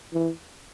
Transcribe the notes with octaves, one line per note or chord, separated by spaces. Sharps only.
E3